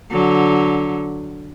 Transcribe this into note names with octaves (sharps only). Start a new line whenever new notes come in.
D3 F#3